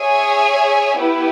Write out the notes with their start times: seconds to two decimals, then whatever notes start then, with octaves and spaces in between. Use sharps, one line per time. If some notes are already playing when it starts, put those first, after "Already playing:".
Already playing: G#4 C#5 E5 G#5
0.99 B3 E4 G4 B4